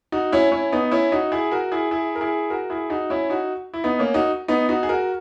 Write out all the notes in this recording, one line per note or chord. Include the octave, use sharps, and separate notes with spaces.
D#4 F#4
C#4 E4
C#4 E4
B3 D#4
C#4 E4
D#4 F#4
E4 G#4
F#4 A#4
E4 G#4
E4 G#4
A#4
E4 G#4
F#4 A#4
E4 G#4
D#4 F#4
C#4 E4
D#4 F#4
E4
B3 D#4
A#3 C#4
D#4 F#4
B3 D#4
D#4 F#4
G#4
F#4 A#4